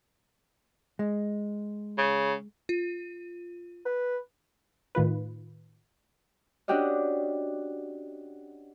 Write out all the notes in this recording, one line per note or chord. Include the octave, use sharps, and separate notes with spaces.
G#3
C#3
F4
B4
A2 D#3 F4 B4
C#4 D4 F#4 G4 D5 D#5